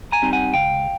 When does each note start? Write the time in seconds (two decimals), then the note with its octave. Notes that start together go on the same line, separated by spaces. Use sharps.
0.12 G#5 A#5
0.22 G3 C4 D#4
0.33 F#5 G#5
0.54 C#2 F5 G5